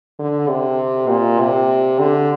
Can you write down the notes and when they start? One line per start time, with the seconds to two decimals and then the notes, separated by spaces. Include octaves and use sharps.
0.19 D3
0.49 C3
1.09 A#2
1.39 C3
1.99 D3